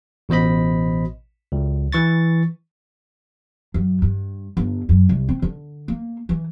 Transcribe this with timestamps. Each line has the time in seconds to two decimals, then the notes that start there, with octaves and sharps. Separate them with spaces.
0.29 A1 B2 C5 D#5 B5
1.52 C#2
1.92 E3 C#6 A6
3.74 F#2
4.02 G2
4.57 G1
4.89 F#2
5.09 C2
5.29 C4
5.42 D3
5.88 A#3
6.29 E3